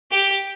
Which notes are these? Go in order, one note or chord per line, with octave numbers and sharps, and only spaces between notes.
G4